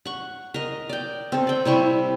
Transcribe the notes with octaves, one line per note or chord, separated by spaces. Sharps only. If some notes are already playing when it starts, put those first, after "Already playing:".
F#5 C#6
A#4 D#5
D5 G5
C4 A4
D5 G5
C3 G3 E4 C#6